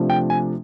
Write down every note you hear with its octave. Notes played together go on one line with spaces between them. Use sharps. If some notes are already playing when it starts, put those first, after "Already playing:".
Already playing: C3 F3 A3 D4
G5
G#5